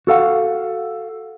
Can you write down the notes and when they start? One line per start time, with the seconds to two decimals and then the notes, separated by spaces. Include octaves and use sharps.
0.07 F#4 A4 F5 F#5